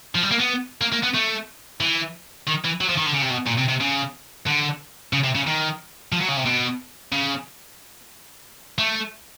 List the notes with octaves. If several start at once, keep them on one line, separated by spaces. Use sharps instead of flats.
F3
G3
A#3
B3
A#3
A#3
B3
A3
E3
D#3
E3
F#3
F3
D#3
D3
C#3
C3
B2
A#2
C3
C3
C#3
D3
C#3
C3
C#3
D#3
F3
F#3
C#3
C3
B2
C#3
A3